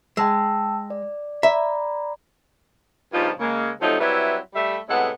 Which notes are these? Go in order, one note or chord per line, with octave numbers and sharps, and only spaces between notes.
G#3 G5 A5 E6
D5
D5 E5 A#5 B5
G2 A#2 C#3 F3 D#4 F4
C#3 G#3 A#3
C3 F3 F#3 A3 D#4 A4
F#3 G3 C4 E4 B4 E5
G3 A3 E5
A2 C3 G#3 B3 A4 F#5